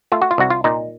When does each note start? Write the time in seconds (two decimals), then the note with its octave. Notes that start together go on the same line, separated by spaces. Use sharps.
0.12 A3 F4
0.22 F#4
0.31 F4
0.38 C2 F#4
0.50 F4
0.64 A#2 D#4